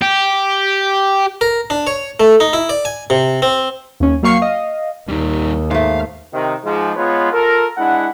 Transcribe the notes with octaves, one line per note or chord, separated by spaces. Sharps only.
G4
A#4
D4
C#5
A3
D#4
E4
D5
G#5
C3
C4
D#2 C#4
F#3 A#3 F5 C#6 C7
D#5 F5
D#2 G3 D#4
G#2 A3 F5
C3 D#3
G#2 F3 G#3
G#3 B3 F4 B4 C#5
F4 A4 A#4
G#3 D4 E4 F#5